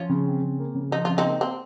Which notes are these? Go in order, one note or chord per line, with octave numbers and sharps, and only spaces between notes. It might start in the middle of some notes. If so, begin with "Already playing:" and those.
Already playing: F3 C#4 F4
C#3
C4
C#3
A#3
C#3
F3 D#4
C#3 F4
C4 D#4
A#3
C4